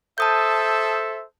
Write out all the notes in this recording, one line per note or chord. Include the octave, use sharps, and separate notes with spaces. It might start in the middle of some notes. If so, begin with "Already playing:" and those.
A4 C5 E5 A5 D#6 G6